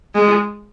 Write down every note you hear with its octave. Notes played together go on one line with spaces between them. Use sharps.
G#3